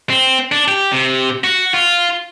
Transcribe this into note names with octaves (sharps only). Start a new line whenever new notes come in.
C4
D4
G4
C3
F#4
F4